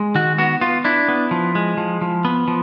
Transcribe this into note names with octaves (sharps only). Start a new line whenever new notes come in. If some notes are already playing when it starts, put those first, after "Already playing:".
Already playing: G#3
D#3 F#4
B3 F#4
B3 F4
D4 E4
B3
F3
G#3
F3
F3
B3
F3